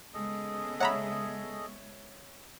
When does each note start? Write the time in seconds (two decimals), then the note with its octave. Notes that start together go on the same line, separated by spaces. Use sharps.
0.14 C#3 G#3 B3 G#4 A4 D#5
0.80 C#5 E5 F#5 A#5 B5 E6